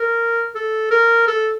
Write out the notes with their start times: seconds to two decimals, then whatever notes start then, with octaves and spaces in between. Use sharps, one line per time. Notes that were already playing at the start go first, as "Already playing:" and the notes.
Already playing: A#4
0.55 A4
0.91 A#4
1.28 A4